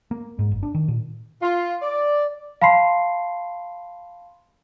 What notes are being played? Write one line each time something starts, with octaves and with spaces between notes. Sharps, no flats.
A#3
G#2
F#1
D4
D#3
A#2
F4
D5
F5 A5 B5 C6 C7